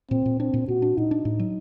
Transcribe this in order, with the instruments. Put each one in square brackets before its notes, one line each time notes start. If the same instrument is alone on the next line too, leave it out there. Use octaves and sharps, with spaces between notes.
[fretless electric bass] A#2 [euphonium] C4
[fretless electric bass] A#2
[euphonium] C4 [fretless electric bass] D4
[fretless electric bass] A#2
[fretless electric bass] A#2 [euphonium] F#4
[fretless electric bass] D4
[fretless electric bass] A#2 [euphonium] D#4
[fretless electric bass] D4
A2
F#3